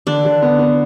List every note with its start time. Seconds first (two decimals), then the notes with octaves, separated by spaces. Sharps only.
0.07 D3 D4
0.25 D3
0.42 B3
0.59 B3